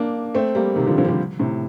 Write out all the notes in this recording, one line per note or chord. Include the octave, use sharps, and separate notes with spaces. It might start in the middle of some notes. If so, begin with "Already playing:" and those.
Already playing: A#3 D4
A3 C4
G3 A#3
C3 D#3
D3 F3
D3 F3
G3
D3 F3
A2 C3